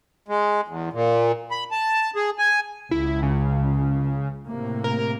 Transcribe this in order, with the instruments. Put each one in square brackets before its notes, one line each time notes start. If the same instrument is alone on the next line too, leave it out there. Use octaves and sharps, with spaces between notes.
[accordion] G#3
E2
A#2
B5
A5
G#4
G#5
[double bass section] C#2 [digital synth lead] E4
[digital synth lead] C#3
[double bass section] A2 C3 A#3
[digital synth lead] A#4